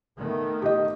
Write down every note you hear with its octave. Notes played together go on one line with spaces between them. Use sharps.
D#3 A3 B3
G4 D#5